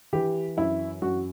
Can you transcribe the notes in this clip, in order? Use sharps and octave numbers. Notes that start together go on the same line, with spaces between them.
E3 G4
F#2 E4
F#2 F#4